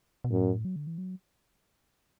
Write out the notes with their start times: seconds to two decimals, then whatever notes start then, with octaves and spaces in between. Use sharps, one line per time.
0.24 B2
0.31 F#2 A2
0.65 F#3
0.76 D3
0.87 E3
0.98 F#3